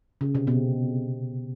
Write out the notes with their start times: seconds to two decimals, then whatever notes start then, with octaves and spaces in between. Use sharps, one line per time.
0.21 C#3
0.35 C3
0.47 B2